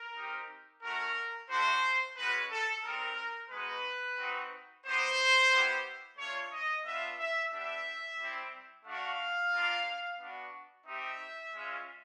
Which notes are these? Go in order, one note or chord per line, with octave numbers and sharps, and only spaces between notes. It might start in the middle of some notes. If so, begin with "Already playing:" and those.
Already playing: A#4
C4 D#4 G4
A3 C#4 F#4 A#4
A3 D4 F#4 C5
G#3 C#4 F#4 B4
A4
G3 C4 D#4 A#4
G#3 B3 D#4 F#4 B4
C4 D#4 F#4
B3 D#4 G4 C5
B3 E4 G4
A3 D4 F4 C#5
D#5
B3 D4 F4 E5
E5
B3 D4 G4 E5
G3 C4 E4
A3 D4 F#4 F5
A#3 D4 F4
B3 D4 F#4
C4 D#4 G4 E5
G#3 C#4 F4